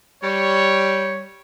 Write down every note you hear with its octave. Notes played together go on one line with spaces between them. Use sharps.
G3 C#5